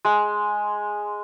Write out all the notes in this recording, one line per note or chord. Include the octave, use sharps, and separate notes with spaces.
G#3